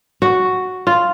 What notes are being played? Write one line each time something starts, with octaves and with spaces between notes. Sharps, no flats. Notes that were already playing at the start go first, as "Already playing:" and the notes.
F#4
F4